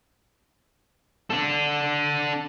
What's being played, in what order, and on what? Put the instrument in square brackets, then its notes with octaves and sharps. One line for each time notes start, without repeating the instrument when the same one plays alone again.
[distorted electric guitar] D4 A4